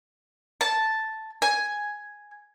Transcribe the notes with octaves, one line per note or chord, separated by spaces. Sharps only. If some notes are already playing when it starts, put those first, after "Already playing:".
A5
G#5